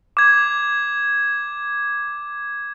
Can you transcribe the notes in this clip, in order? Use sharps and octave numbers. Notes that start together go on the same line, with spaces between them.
D6 G#6